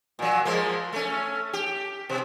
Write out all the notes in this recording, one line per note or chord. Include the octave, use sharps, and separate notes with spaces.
A#2 F#3
F3 G#3 A#3
A3 C#4
G4
B2